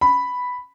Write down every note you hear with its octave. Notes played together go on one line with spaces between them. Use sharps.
B5